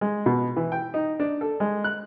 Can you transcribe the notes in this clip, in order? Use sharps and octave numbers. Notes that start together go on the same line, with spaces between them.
G#3
B2
E3
G5
D#4
D4
A4
G#3
F#6